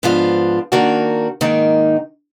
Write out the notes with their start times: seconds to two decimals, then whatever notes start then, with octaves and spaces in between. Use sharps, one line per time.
0.03 G#2 F3 B3 D4 F4
0.72 D#3 A#3 D4 F#4
1.41 G#2 D#3 A#3 D#4